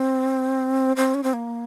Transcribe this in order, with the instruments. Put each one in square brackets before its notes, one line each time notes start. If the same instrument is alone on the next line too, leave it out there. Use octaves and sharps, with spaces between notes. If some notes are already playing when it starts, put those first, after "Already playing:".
Already playing: [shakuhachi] C4
C4
C#4
C4
A#3